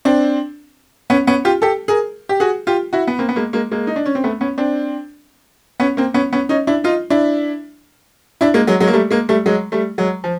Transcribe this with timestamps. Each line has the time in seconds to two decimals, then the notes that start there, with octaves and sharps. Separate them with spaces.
0.05 C4 D4
1.10 B3 C#4
1.27 B3 C#4
1.45 F4 G4
1.62 G4 A4
1.88 G#4 A#4
2.29 G4
2.40 F#4 G#4
2.67 F4 G4
2.93 E4 F#4
3.07 B3
3.19 A#3 C4
3.29 B3
3.36 G#3 A#3
3.53 G#3 A#3
3.71 G#3 A#3
3.87 D#4
3.96 D4
4.06 C#4
4.15 C4
4.24 A3 B3
4.41 B3 C#4
4.58 C4 D4
5.80 B3 C#4
5.97 A#3 C4
6.14 B3 C#4
6.33 B3 C#4
6.49 C#4 D#4
6.67 D4 E4
6.84 D#4 F4
7.10 D4 E4
8.41 D4 E4
8.54 G#3 A#3
8.67 F#3 G#3
8.80 F#3 G#3
8.88 A#3
8.93 G3 A3
9.11 G#3 A#3
9.29 G3 A3
9.46 F#3 G#3
9.72 G3 A3
9.98 F#3 G#3
10.24 F3